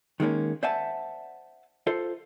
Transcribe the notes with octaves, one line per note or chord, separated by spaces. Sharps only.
D#3 G#3 A#3 C#4
C5 D5 E5 F#5 G#5 A5
F4 A4 C5